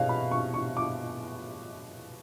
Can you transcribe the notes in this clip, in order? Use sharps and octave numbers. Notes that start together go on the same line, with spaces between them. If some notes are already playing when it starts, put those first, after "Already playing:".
Already playing: B2 G#3 C#5 F5
B5
C#6
C#6
D6